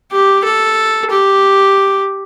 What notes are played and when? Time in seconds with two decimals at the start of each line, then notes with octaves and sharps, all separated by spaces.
0.12 G4
0.44 A4
1.11 G4